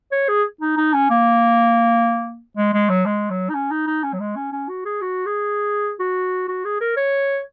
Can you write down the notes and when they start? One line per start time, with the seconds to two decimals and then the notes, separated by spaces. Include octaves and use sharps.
0.12 C#5
0.29 G#4
0.61 D#4
0.77 D#4
0.93 C#4
1.10 A#3
2.57 G#3
2.73 G#3
2.89 F#3
3.06 G#3
3.30 F#3
3.49 D#4
3.54 C#4
3.71 D#4
3.87 D#4
4.04 C#4
4.13 F#3
4.20 G#3
4.36 C#4
4.52 C#4
4.69 F#4
4.85 G#4
5.01 F#4
5.26 G#4
5.99 F#4
6.48 F#4
6.64 G#4
6.81 A#4
6.97 C#5